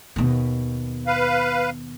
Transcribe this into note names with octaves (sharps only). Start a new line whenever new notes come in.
D#2 B2
B4 F5